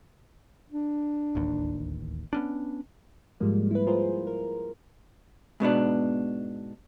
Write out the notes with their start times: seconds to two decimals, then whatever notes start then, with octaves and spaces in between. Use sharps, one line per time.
0.70 D4
1.35 D1 A1 D#2
2.33 B3 C#4 D4
3.40 G#2 F3 G3 G#3 A#3
3.71 E4 B4
3.87 F4 G#4 A#4 C5
4.27 A#4
5.60 G#2 B2 B3 D4